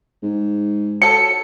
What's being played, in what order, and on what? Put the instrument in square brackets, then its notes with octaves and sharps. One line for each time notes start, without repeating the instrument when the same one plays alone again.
[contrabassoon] G#2
[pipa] F#3 A4 [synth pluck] C#7